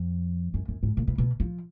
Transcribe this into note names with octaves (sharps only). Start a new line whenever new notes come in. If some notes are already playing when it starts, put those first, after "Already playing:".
Already playing: F2
F#2
F#2
G#2
A#2
B2
B2
F3